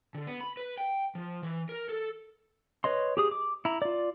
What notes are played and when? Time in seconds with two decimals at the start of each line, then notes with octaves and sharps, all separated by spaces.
0.15 D3
0.27 B3
0.41 B5
0.57 B4
0.78 G5
1.15 F3
1.43 E3
1.69 A#4
1.89 A4
2.84 B4 C#5 D#5 C6
3.17 G4 G#4 D#6
3.31 D6
3.65 E4 A#5
3.82 F4 D5